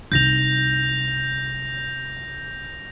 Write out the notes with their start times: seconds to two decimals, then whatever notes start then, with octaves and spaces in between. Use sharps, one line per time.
0.12 C2 D#4 G6 A#6 F7